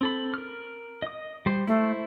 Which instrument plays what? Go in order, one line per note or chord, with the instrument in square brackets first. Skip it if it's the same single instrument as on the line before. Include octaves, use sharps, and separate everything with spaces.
[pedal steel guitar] C4 A4 B5
A#4 F6
D#5 D#6
G3 C5
[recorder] A3 [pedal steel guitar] E4 C5